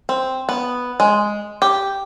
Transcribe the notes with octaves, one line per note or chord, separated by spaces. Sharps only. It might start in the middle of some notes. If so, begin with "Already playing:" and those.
C4
B3
G#3
G4